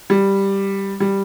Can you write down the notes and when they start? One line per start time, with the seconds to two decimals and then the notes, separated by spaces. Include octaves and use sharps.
0.10 G3
1.00 G3